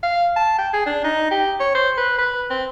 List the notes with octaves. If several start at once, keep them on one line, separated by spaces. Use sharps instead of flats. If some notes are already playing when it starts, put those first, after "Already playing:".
F5
A5
G5
G#4
D4
D#4
G4
C#5
C5
B4
B4
C4